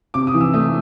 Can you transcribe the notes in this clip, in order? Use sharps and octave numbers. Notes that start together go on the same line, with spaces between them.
C3 D6
D#6
E3
E6
A3